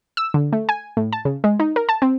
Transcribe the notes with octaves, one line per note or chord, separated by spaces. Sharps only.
E6
D3
A3
G#5
A2
A5
C#3
G#3
D#4
A#4
A5
C4